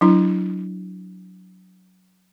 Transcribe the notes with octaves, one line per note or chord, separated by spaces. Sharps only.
F#3 D4 E4